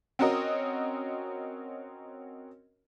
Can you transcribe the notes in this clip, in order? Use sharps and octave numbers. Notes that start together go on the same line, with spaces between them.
C4 C#4 F#4 A#4 D#5